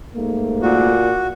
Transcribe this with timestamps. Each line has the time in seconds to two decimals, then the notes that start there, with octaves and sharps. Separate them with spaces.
0.15 G#2 A3 A#3
0.62 A#2 F#4